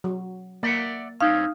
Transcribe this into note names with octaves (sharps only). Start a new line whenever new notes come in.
F#3
A#3 D5 E5 F#5
G2 C4 C#4 D#4 F5 D#6 F6